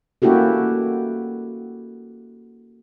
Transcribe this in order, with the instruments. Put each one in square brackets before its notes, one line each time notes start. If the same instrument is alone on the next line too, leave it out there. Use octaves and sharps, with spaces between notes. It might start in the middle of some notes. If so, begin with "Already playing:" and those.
[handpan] A#3 C#4 E4 F#4 G4 A4